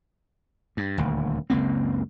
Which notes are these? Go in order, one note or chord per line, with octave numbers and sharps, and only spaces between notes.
G2
D#1 D2
F#1 C#2 A#3 C4